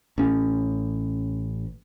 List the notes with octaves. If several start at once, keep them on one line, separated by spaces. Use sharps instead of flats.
A1 C#4